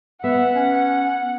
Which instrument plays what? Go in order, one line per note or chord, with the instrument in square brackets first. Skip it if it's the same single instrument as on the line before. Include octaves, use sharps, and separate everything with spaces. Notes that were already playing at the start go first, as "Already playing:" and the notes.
[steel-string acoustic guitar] B3 [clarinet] E5 [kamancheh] F#5
[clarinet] C#4